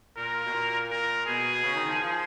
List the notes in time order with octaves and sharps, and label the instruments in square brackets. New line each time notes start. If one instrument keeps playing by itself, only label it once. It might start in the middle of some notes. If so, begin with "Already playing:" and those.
[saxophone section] A#2 [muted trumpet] A#4
[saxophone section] B2
A#2
[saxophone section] A#2 [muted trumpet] A#4
[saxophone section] B2 [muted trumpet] G#4
[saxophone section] C#3
D#3
F3
F3